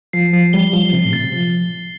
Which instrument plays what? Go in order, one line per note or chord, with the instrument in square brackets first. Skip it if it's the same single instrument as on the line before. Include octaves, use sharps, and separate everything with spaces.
[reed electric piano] F3 [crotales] C7
[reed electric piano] F3 [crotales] C7
[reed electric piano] G3 [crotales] G7
[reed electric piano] F3 [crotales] G7
[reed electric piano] C3 [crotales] G7
[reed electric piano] A2
[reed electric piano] C3 [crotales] A6
[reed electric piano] F3 [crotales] G7